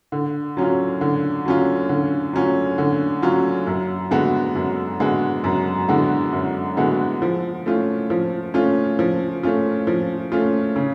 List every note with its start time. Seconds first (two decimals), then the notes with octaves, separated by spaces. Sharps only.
0.12 D3
0.57 F#3 C#4 F4
1.01 D3
1.45 F#3 C#4 F4
1.89 D3
2.33 F#3 C#4 F4
2.78 D3
3.22 F#3 C#4 F4
3.67 F#2
4.11 D3 G#3 B3 F#4
4.55 F#2
5.00 D3 G#3 B3 F#4
5.44 F#2
5.88 D3 G#3 B3 F#4
6.33 F#2
6.77 D3 G#3 B3 F#4
7.22 F3
7.66 A3 C#4 F4
8.10 F3
8.54 A3 C#4 F4
8.99 F3
9.43 A3 C#4 F4
9.87 F3
10.32 A3 C#4 F4
10.76 C#3